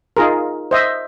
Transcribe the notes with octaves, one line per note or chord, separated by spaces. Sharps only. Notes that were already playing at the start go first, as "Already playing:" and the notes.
D#4 F4 G#4 A#4
C5 D#5 E5